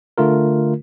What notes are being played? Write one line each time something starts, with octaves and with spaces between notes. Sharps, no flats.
D3 A3 F4 A#4